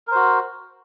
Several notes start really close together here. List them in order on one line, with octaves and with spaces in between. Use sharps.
A#4 C5 F#4